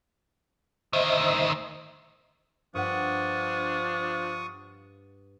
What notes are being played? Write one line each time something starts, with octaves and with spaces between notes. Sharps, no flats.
D2 D#3 C5 D#5 E5
G2 F3 D4 B4 F#5 C#6 D#6